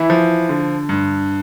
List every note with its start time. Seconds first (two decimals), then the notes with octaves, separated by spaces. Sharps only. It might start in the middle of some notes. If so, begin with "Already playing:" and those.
Already playing: E3 E4
0.10 F3
0.49 D3
0.89 G2